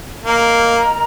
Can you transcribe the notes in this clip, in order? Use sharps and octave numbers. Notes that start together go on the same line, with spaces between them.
A#3 A#4 D#5 A#5